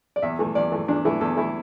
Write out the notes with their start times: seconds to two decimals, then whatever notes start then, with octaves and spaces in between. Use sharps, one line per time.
0.16 D5
0.22 E2 E5
0.39 E3 A3
0.55 E2 D5
0.72 E3 A3
0.88 E2 D4
1.05 E3 A3 E4
1.21 E2 A4
1.37 E3 A3 E4